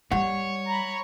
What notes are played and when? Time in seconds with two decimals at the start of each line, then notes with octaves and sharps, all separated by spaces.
0.11 G3 C#5 F#5
0.67 A#5 B5